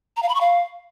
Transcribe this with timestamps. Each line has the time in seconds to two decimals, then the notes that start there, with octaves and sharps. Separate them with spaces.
0.17 A#5
0.23 F5
0.29 B5
0.35 C#6
0.41 F5